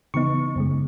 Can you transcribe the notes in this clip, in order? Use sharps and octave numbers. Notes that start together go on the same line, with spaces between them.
C#3 E3 B3 D#4 C#6
F#2 C#3 G#3